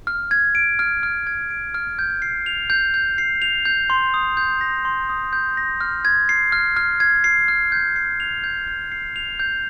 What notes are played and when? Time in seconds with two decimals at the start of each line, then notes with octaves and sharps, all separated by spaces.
0.07 F6
0.31 G#6
0.55 D7
0.79 F6
1.03 F6
1.27 G#6
1.51 D7
1.74 F6
1.99 G6
2.22 C7
2.46 F7
2.70 G6
2.94 G6
3.18 C7
3.42 F7
3.65 G6
3.90 C6
4.14 D#6
4.37 G6
4.61 A#6
4.85 C6
5.09 D#6
5.33 G6
5.57 A#6
5.81 F6
6.05 G#6
6.29 C7
6.52 F6
6.77 F6
7.00 G#6
7.24 C7
7.48 F6
7.72 G6
7.96 C7
8.20 F7
8.44 G6
8.68 G6
8.92 C7
9.16 F7
9.40 G6